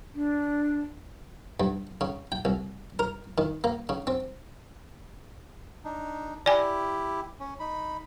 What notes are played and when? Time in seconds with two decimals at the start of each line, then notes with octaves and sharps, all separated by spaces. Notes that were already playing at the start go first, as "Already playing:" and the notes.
0.15 D4
1.60 G2
2.01 C#3
2.32 G5
2.45 C2
2.99 A#4
3.38 D#3
3.64 A#3
3.89 C#3
4.07 C4
5.84 D4 D#4
6.46 E4 G4 D5 G#5
7.40 C#4
7.60 D#4 B5